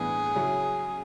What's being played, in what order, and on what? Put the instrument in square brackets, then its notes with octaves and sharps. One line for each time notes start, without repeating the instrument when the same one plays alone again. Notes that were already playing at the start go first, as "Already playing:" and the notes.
Already playing: [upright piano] A2 E3 B3 D4 [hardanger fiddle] G#4
[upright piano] C#3 F#3 C#4 E4